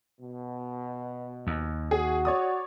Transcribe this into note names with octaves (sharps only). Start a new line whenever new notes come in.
B2
D#2
F#4 G#4
C#5 D5 D#6